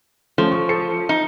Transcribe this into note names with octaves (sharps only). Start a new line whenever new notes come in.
F3 A3 C#4
C#6
A4 C#7
D#4